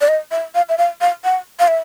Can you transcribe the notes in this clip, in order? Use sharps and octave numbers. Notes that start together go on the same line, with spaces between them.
D5
D#5
E5
F5
E5
F5
F5
F#5
F5
E5